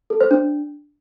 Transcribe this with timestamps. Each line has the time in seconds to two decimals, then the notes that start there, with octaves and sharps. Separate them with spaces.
0.10 A4
0.20 C5
0.31 D4